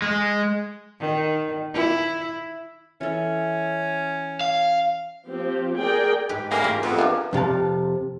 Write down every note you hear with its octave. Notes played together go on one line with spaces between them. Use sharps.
G#3
D#3
E4
E3 C#4 A4
F5
F3 C4 G4
G#4 A#4 D5 G5
G#2 G4 B4
D3 G3 A#3 C#4 C#5 G#5
E4 F4 G4
F2 B3
A#3 D4 F4
F2 C3 F5 A5